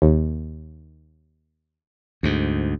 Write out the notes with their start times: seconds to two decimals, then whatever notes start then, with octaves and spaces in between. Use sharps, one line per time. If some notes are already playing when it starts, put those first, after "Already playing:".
0.02 D#2
2.23 D2 G#2